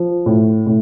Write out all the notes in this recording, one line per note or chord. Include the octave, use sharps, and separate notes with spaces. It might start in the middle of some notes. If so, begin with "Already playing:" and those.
Already playing: F3
A2
A2